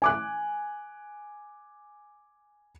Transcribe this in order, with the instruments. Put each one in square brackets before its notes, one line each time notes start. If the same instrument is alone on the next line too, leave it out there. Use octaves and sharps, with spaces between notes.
[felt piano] G#5 D6 F#6